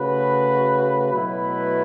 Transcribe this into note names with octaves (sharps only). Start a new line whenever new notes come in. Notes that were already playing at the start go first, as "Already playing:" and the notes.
Already playing: C#3 A3 F#4 B4
B2 F#3 A3 E4 B4